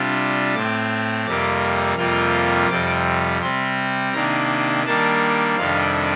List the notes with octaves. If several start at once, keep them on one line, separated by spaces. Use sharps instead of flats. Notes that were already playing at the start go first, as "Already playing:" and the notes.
Already playing: C3 G3 D4 F4
A2 A3 C4 D6
F2 C3 G3 A#3 D6
F2 C3 G3 A#3 F4 F6
F2 C3 G3 D6
C3 G3 C4 C6
C3 D#3 A#3 D4 A#5
D#3 G3 A#3 D4 A5
F2 C3 D#3 G3 D4 F5